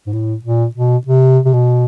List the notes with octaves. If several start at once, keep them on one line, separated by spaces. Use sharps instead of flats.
G#2
A2
A#2
B2
C3
C3
B2